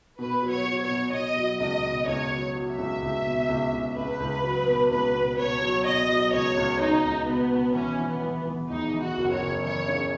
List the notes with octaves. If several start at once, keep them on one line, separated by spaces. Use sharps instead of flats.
B2 B4
F#3
C#5
F#3
C#5
B2
B2 D#5
F#3
C#2 D#5
B2
C#2 C#5
F#3
F#3
E5
C#2
C#2
B2
C#2
C#2
C#2 B4
C#2
F#3
B2
C#2 B4
B2
B2 C#5
F#3
B2 D#5
F#3
C#2 C#5
C#2
C#2 D#4
C#2
B2 B3
B2
E3 C#4
E3
B3
E3
E3
E2 D#4
E3
F#4
F#1
C#5
F#1
E3 C#5
C#3